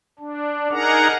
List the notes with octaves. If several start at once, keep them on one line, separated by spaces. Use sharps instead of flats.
D4
D#4 G#4 A#4 F#5 A#5